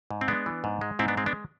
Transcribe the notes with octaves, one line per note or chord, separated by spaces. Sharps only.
G#2
C4
G#3 B3 D4
E3
G#2
G#3
G#2 C4 E4
B3 D4
G#3 C4
B3 D4